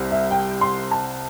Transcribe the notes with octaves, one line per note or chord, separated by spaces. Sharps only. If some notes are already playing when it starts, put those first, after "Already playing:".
Already playing: C2 C3
E5
G5
C6
A5